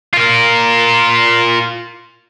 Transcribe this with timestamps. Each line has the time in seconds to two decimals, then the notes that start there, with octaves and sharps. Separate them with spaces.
0.13 F4 A#4